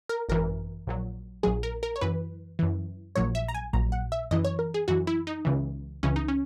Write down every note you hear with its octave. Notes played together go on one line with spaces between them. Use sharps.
A#4
G#1 F#2 E3 A#4
A#1 A#2 F#3
A#1 A#2 F#3 G#4
A#4
A#4
C#5
F#2 E3 B4
F#2 E3
A#1 A#2 F#3 C#5
E5
A#5
G#5
A#1 A#2 F#3 A#5
F#5
E5
F#2 E3 D#5
C#5
A#4
G#4
F#2 E3 F#4
E4
D#4
C#2 C#3 E3
C#2 C#3 E3 C#4
D#4
C#4